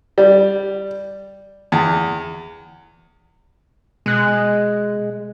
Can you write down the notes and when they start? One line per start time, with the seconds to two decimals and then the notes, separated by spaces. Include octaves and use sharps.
0.18 G3
1.72 E2
4.06 B2 G#3 F#6